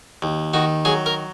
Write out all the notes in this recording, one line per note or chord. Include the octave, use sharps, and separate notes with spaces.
D#2
D#3 F#4
F#3 G#4
A#4